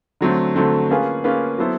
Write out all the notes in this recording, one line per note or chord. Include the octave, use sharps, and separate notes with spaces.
D3 F#3 A3 C4
D3 F#3 A3 C4
A#3 C#4 F4 G#4 B4
A#3 C#4 F4 G#4 B4
F#3 B3 E4 A4 C5